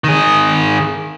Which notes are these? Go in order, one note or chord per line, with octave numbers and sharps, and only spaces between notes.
D#3 G#4